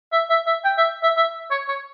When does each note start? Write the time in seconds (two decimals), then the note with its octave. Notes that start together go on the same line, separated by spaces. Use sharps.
0.12 E5
0.30 E5
0.47 E5
0.65 G5
0.78 E5
1.03 E5
1.17 E5
1.51 C#5
1.69 C#5